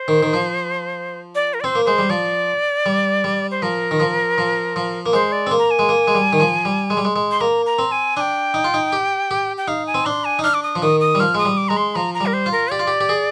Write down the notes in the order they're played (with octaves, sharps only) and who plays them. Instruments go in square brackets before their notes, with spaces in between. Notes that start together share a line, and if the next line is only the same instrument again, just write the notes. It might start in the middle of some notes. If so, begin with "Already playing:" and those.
Already playing: [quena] C5
[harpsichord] D#3
D#3
F3
[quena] D5
A#4
D5
[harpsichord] C4 [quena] C5
[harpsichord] A#3
[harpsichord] G#3 [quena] C5
[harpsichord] G3
[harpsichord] F3 [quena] D5
[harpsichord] G3
G3
[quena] C5
[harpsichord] F3 [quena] A#4
[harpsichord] D#3
F3
F3
F3
A#3
[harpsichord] G#3 [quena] C5
[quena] D5
[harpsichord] C4
A#3
[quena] A#5
G#5
[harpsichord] G#3
A#3
G#3
G3
D#3
F3
G3
G#3
G3
G#3
G#3
[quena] C6
[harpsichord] A#3 [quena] A#5
[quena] A#5
[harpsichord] C4
[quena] G#5
[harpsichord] D4 [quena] G5 G#5
[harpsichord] D#4
F4
D#4
G4
G4
[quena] G5
[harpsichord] D#4 [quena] F5
[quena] G#5
[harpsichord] C4
[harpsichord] D4 [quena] C6
[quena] G#5
[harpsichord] D#4
[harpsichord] D4 [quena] F6
[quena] D6
D#6
[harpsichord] F3
[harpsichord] D#3 [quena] D#6
[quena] D#6
[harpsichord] G3
[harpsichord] F3 [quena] F6
[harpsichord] G#3 [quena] D#6
[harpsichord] G3
[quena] D6
[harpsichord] G#3 [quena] A#5
[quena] C6
[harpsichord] F3 [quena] A#5
[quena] A#5
[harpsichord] G3
[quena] A#4
C5
[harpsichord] F4
[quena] A#4
[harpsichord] G4 [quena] D5
[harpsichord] F4
G4
G4
G#4